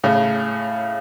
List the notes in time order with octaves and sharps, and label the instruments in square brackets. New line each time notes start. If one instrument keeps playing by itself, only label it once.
[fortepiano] A2 C#3